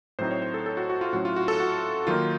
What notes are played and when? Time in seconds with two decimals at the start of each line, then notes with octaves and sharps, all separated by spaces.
0.19 A2 F#3 C4 D#4 C5
0.31 C#5
0.42 C5
0.54 A4
0.66 A4
0.77 F#4
0.90 F#4
1.01 F4
1.13 A2 F#3 A3 C#4 F#4
1.25 F4
1.36 F#4
1.48 A4
1.60 F#4
2.07 D#3 F#3 A#3 D#4 F4